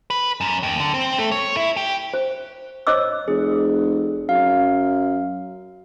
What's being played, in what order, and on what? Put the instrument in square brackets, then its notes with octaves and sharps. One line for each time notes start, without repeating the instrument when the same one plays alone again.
[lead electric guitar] B4
F#2
D#2
D3
C4
A3
C#5
E4
G4
[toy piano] C5
C5 C#5 D#5 D6 E6
[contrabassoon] F1 [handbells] G#4
[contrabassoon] F#2 [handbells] F5